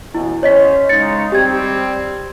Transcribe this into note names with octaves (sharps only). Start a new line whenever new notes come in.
A1 B2 E3 E4
C#3 C#4 C5 C#5 D#5 B6
C#3 G#3 D#4 A6 C#7
G3 C4 G4 G#6